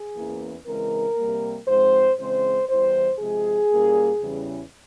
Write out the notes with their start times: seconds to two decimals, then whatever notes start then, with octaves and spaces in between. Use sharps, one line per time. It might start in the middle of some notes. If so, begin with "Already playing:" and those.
Already playing: G#4
0.16 E2 E3 A#3 C#4
0.66 C#3 E3 G#3 C4 A#4
1.17 C3 G3 A#3
1.68 G#2 F3 G#3 C4 C5
2.18 C#3 E3 G#3 C4 C5
2.68 E2 E3 G3 C5
3.19 C3 F3 G#3 G#4
3.70 A#2 G3 A#3 C#4
4.21 E2 C#3 E3 G3 C#4